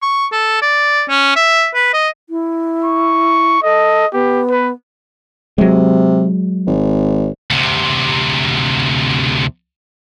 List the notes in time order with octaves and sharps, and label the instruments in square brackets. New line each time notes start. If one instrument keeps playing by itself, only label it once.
[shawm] C#6
A4
D5
C#4
E5
B4
D#5
[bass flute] E4
[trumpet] C#6
[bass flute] A4 [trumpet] D#5
[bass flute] B3 [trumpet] G4
[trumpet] B4
[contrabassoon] C3 [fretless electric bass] F#3 G#3
[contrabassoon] G#1
[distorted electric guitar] D2 C3